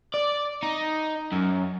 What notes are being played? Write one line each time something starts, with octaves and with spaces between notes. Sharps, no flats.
D5
D#4
F#2